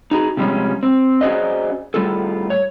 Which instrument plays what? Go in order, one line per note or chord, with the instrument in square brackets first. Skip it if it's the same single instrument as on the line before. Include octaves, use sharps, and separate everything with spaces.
[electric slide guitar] D#4 F#4 G#4
C3 F3 G3 G#3 C#4
C4
C#4 F#4 G#4 C5 D5 D#5
A2 G3 C4 F4 G#4 A4
C#5